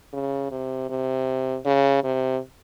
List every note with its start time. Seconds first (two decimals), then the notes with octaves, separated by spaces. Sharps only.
0.13 C#3
0.51 C3
0.89 C3
1.65 C#3
2.03 C3